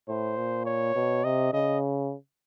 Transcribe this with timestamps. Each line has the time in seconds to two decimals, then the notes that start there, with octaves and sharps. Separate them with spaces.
0.08 A2 C5
0.37 A#2
0.66 C#5
0.95 B2
1.24 C3 D#5
1.53 C#3 D#5